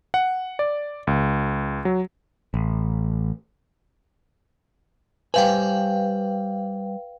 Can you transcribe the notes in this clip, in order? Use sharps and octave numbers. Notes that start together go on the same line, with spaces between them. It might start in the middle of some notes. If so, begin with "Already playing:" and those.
F#5
D5
C#2
F#3
A1
G3 B4 C5 F5 G5 G#5